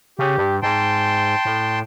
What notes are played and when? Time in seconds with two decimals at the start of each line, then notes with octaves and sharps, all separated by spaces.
0.19 C#3 G4
0.37 G2
0.63 G#2 G5 A5 C6
1.45 A2